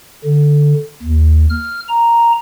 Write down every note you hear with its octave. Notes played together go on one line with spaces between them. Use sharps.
D3
D#2
F6
A#5